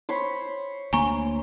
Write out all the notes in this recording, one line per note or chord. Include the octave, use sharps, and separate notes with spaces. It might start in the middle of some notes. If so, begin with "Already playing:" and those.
C5 C#5 B5
D2 A#3 G#5 A#5 C#6